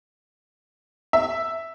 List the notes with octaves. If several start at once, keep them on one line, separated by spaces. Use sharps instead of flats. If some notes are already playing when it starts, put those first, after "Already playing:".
E5